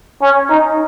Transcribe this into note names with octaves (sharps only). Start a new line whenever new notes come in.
C#4
D#4